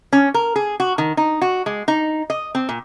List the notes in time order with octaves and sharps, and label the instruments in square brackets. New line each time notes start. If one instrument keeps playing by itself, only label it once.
[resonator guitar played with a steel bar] C#4
A#4
G#4
F#4
D#3
D#4
F#4
G#3
D#4
D#5
C4
A#2